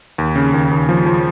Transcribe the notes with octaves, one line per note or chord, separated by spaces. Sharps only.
D#2
C#3
D#2
D#2
F3
F3